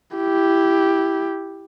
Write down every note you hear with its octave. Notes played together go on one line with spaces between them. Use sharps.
E4 G4